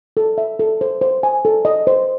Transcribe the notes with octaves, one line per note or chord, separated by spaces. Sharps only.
A4
E5
A4
C5
C5
G#5
A4
D#5
C5